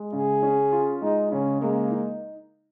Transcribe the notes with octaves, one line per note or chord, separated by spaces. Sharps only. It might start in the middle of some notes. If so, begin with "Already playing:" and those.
Already playing: G#3
C#3 G#4
C#4
F4
G#3 D#4
C#3 C#4
G#3 A#3
D#4